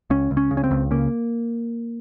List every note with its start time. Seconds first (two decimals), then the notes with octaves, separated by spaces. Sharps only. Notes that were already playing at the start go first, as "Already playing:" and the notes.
0.10 C#2 C#4
0.31 C#2
0.37 C#4
0.51 C#3
0.57 C#4
0.64 C4
0.71 C#2
0.91 C#3 A#3